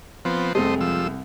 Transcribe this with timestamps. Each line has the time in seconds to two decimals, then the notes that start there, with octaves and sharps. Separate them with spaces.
0.25 F3 B3 C4
0.55 F1 C2 G#3 A3 C5 D#5
0.81 F3 E6
1.06 C2